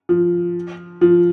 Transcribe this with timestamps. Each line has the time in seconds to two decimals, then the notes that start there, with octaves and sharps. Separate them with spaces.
0.09 F3
1.01 F3